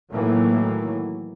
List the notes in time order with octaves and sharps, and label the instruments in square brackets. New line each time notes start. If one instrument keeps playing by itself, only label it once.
[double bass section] A2 D#3 E3 F#3 A3 A#3